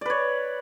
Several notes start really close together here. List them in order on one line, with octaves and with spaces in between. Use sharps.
D5 B4 C#5